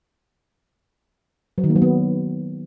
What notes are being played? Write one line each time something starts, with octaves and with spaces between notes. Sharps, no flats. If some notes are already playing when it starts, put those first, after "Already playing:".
F#3
D#3
A#3
F#3
B3